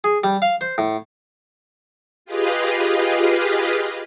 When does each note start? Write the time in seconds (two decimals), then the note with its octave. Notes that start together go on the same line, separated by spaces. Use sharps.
0.04 G#4
0.24 G3
0.42 F5
0.61 C5
0.78 A2
2.25 F4 G4 G#4 B4 D#5 F5